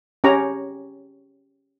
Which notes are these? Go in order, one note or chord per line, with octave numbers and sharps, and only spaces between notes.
C#4 G4 C#5 A#5